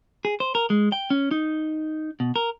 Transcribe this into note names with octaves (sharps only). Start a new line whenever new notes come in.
G#4
C5
A#4
G#3
G5
C#4
D#4
B2
A#4